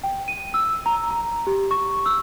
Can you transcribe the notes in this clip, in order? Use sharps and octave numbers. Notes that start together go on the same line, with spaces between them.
G5
D#7
E6
A#5
A#5
G4
C#6
E6